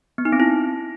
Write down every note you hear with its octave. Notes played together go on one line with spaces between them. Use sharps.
B3
D#4
C4
E4